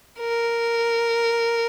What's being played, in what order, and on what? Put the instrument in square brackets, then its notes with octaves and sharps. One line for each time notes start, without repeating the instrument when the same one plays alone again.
[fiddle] A#4